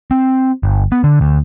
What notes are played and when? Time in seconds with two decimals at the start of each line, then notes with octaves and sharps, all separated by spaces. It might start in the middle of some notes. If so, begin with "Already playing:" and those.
0.11 C4
0.63 G1
0.92 B3
1.04 D3
1.21 D2